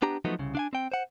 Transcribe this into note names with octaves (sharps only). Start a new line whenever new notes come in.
B3 D4 G4 A#5
F3 F#3 A3 B3 D#4
C2 C#3
D4 F5 G#5
C4 G5
C5 F#5